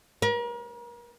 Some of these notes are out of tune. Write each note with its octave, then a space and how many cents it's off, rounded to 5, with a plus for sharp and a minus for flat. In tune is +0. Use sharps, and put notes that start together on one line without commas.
A#4 +40